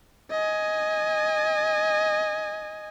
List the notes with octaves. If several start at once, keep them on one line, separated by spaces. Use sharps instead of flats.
D#5 G#5